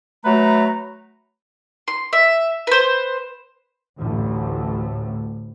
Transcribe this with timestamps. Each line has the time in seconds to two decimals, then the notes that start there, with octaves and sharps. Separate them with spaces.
0.25 F#3 A3 B4 A#5
1.88 C6
2.13 E5
2.67 B4 C5
3.99 A1 D2 A2